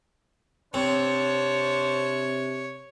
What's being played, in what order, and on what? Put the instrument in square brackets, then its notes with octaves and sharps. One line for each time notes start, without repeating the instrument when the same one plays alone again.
[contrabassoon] C3 [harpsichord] C4 [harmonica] D4 C5 [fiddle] C#5